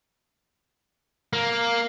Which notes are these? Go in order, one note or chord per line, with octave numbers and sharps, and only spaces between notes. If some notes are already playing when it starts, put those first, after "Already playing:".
A#3